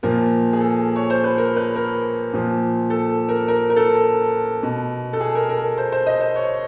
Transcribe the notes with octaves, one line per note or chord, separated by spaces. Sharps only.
A#2 F3 A#4
G#4
A4
C#5
C5
B4
A#4
B4
A#4
A#2 F3
A4
A#4
A#4
A#4
A4
B2
A4
G#4
A#4
A#4
A#4
C5
C5
D#5
C5
C#5